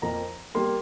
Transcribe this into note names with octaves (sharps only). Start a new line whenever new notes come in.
F2 F3 A#3 A#5
G3 A#3 C6